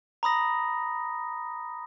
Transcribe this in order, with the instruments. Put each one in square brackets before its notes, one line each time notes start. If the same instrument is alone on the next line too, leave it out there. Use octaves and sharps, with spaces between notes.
[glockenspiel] A#5 B5 D#6 A#6